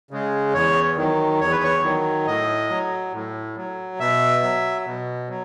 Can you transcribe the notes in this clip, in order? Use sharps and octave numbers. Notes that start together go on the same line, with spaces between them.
C#3 G#3
E2 C#5
D#3 F#3
E2 C#5
B4
C#5
D#3 F#3
A2 D#5
F#3
A2
F#3
B2 E5
F#3
B2
F#3